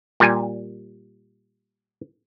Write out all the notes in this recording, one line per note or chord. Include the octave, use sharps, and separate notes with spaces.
A#2 G3 G#5